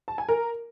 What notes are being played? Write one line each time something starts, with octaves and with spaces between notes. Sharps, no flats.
A5
G#5
A#4